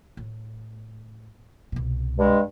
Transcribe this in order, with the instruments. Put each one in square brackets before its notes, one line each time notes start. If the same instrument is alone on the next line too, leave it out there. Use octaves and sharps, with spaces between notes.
[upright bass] A2
C2 B2
[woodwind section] G2 G#3